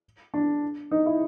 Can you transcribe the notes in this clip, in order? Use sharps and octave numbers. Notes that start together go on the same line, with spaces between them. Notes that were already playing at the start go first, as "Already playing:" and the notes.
D4
D#4
E4